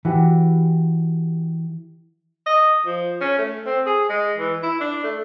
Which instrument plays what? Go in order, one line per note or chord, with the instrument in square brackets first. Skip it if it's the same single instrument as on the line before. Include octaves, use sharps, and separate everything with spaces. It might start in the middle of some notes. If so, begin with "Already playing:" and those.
[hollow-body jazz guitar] E3 F#4 G4
[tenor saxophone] D#5
F3
C#4
A3
C4
G#4
G#3
E3
E4
D4
A3